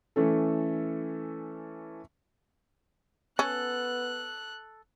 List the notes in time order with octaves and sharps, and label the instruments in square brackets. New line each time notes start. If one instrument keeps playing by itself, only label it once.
[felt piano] E3 A3 C#4 A4
[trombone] B3 [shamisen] C#4 [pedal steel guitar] A4 [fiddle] F#6